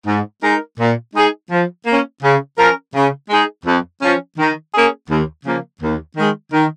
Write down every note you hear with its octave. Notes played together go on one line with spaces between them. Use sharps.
G#2
G#3 D#4 A#4
A#2
G#3 D#4 G#4
F3
A#3 C#4
C#3
F3 C#4 A#4
C#3
G#3 D#4 G#4
F2
F3 C#4
D#3
A#3 C#4 G#4
D#2
C#3 F3 A#3
D#2
D#3 G#3
D#3